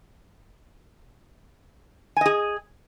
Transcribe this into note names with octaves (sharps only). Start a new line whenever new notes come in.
G#4 D#5 G#5